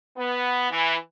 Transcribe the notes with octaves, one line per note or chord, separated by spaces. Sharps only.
B3
E3